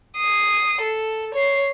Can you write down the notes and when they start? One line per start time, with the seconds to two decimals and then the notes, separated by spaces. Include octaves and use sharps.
0.18 D#6 C7
0.81 A4
1.34 C#5 C7